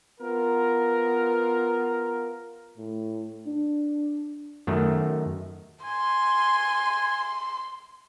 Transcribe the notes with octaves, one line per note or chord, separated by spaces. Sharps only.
B3 F4 A#4
A2
D4
F#2 D#3 A3
G#5 C6